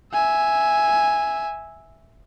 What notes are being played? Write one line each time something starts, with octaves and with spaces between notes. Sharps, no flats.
E5 G#5